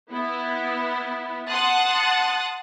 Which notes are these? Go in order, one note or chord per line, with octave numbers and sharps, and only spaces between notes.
B3 E4
F#5 A5 C6 D#6 F#6 A6